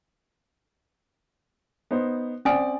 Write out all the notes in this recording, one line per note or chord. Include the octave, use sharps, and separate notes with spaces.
B3 D#4 C5
C4 C#4 D5 G#5 D#6